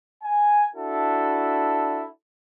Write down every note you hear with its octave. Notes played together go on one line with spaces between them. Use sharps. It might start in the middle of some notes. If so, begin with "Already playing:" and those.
G#5
D4 E4 F#4 A4